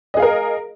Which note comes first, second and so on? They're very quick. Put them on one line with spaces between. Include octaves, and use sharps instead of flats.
D#5 G#4 F5 A#4